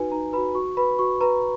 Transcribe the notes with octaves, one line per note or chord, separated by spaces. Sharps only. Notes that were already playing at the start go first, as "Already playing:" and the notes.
Already playing: D#4 F#4 B4 G#5
D#4 A#5
F#4 B4 B5
F#4 C#6
B4 B5
F#4 C#6
B4 A#5